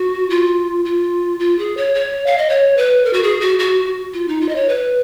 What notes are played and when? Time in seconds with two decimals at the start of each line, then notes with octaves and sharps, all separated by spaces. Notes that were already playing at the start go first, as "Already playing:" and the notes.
Already playing: F#4
0.30 F4
0.85 F4
1.40 F4
1.58 G#4
1.77 C#5
1.95 C#5
2.26 F5
2.38 D#5
2.49 C#5
2.77 B4
3.05 A#4
3.13 F#4
3.23 G#4
3.41 F#4
3.59 F#4
4.14 F4
4.28 D#4
4.41 F4
4.49 D#5
4.55 C#5
4.69 B4